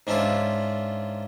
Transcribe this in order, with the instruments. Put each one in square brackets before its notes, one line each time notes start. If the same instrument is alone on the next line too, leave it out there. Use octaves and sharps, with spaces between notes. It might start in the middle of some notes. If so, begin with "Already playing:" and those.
[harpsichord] G#2 C#4 D4 E4 F4